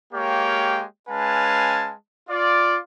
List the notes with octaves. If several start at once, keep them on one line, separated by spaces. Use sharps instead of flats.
G#3 A#3 G4 C#5 F5 G5
G#3 C#4 B4 F5 G#5 A5
F4 D5